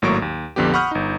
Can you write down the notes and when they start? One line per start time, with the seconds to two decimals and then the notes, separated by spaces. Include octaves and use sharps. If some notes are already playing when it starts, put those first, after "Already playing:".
0.02 G#1 A2 F#3 A#3 C#6 D7
0.22 D#2
0.56 A#1 F2 D3 B3 G4
0.74 F#5 B5 C#6 D#6 F6 G6
0.91 G1 D#4